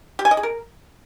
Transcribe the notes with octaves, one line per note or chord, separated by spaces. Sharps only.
G4
G#5
D#5
G#4
A#4